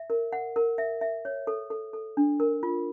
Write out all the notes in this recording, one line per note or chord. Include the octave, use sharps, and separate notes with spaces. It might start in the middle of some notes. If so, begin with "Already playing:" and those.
Already playing: E5
A#4
F#5
A#4
E5
E5
C#5
A4
A4
A4
D4
A#4
F4